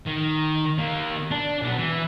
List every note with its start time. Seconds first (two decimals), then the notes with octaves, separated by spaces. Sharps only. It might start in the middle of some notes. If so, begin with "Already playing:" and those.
0.06 D#3
0.79 D#3 A#3
1.31 D4
1.62 B1 B3
1.78 E3